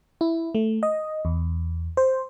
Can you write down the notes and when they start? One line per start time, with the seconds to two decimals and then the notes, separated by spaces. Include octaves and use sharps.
0.21 E4
0.55 A3
0.83 D#5
1.25 E2
1.97 C5